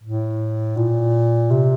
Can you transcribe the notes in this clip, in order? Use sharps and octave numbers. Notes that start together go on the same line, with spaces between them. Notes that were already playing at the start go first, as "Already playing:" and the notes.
A2
A#2
C3